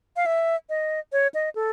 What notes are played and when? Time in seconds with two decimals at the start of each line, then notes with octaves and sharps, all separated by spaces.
0.16 F5
0.26 E5
0.69 D#5
1.12 C#5
1.34 D#5
1.55 A4